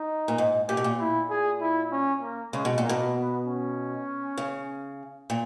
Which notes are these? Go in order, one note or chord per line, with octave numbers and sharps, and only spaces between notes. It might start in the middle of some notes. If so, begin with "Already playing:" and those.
Already playing: D#4
A#2
G#2
A#2 G4
B2
A#2
E4
G#4
E4
C#4
A#3
C#3 G#3
B2
A#2
A#3
B2
B3
C#4
C#3
A#2